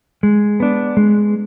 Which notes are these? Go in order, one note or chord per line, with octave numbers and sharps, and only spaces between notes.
G#3
B3 D4
G#3